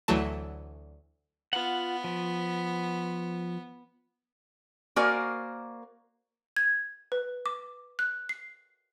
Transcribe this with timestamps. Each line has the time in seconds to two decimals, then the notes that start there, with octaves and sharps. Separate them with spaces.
0.08 D2 E3 F#3 A3 A5
1.53 B3 F4 F#5
2.04 F3
4.96 A#3 F#4 A#4 C5 D5 G#5
6.56 G#6
7.12 B4
7.46 D6
7.99 F#6
8.29 C7